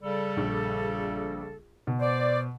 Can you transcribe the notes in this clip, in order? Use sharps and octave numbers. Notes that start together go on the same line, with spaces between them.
C#3 G3 A4
A#1
B2
C5 D5